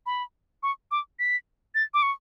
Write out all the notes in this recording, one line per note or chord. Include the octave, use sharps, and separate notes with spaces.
B5
C#6
D6
B6
A6
D6
C#6